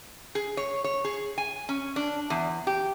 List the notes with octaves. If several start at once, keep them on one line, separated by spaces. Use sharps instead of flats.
G#4
C#5
C#5
G#4
G#5
C#4
D4
E2
G4